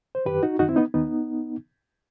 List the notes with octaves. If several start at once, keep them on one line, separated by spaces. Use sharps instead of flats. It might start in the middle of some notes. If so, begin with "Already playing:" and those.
C5
F#2 D#3 G4 B4
D#4 F#4
F#2 D#3 D#4 F#4
C4 E4
B3 D#4
D#2 D#3 B3 D#4